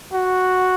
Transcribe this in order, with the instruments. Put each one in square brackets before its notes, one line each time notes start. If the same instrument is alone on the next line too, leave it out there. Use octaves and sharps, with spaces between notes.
[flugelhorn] F#4